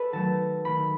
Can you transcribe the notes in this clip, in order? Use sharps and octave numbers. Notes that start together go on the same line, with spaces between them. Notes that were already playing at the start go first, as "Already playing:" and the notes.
Already playing: A4 B4
D#3 F#3 A3 A5
D#3 A3 B5